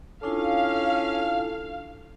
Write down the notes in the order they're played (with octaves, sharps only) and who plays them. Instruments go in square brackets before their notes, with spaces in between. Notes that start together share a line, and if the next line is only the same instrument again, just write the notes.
[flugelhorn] C#4 [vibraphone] D4 E4 F4 [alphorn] A4 [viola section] F5